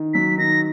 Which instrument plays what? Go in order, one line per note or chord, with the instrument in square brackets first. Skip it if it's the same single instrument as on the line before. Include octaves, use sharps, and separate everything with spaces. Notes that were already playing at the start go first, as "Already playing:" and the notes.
Already playing: [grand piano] D#3
[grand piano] F#3 [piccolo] B6
[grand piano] D#3 [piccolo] A#6